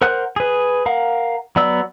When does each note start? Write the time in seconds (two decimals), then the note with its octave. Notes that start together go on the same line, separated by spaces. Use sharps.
0.02 A#4 C5 F#5 F#6
0.36 G#4 B4
0.86 A#4 F5 F#5
1.56 F#3 B3 D5 E6